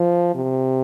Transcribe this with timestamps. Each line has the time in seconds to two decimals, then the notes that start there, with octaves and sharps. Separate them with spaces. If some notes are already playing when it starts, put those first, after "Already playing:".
Already playing: F3
0.35 C3